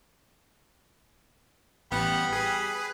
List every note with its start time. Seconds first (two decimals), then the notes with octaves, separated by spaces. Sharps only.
1.91 A1 G3 B3 F#5
2.32 G#4 B4